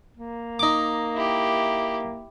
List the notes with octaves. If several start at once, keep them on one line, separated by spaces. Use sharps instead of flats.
A#3
D#4 D6
E4 G4